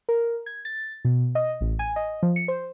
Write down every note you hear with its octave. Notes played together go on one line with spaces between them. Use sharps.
A#4
G#6
A6
B2
D#5
A1
G#5
D#5
F3
C#7
C5